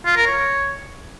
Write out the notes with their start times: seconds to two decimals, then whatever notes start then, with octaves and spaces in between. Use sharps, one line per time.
0.06 F4
0.16 A#4
0.27 C#5